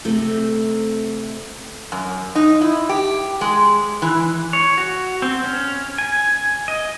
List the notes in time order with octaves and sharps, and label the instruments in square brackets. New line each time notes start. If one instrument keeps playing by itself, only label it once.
[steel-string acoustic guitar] C3 A3 C4
[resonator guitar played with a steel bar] F#2
D#4
E4
G4
G#3
E3
[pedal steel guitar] C#5
F#4
C4
C#4
G#5
D#5